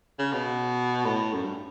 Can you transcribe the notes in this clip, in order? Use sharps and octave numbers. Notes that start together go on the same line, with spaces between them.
C#3
B2
A2
F#2
G2